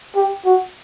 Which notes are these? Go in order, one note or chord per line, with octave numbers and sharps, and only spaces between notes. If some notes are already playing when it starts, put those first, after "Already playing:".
G4
F#4